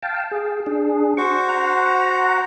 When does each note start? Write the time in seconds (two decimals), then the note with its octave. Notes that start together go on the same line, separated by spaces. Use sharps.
0.03 F5 G5 A5
0.31 G#4
0.66 D4 G#4
1.17 F#4 C5 C#6
1.49 F#5 A#5